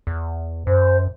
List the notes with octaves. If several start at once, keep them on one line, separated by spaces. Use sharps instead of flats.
E2
F#2 C5